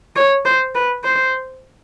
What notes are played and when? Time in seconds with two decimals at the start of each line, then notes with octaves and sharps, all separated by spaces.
0.16 C#5
0.45 C5
0.75 B4
1.04 C5